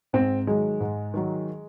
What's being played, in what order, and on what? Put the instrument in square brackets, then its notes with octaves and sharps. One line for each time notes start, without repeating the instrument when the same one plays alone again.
[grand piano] G#2 [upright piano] C4
[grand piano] D#3 F#3 [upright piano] G#3
[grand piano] G#2
D#3 F#3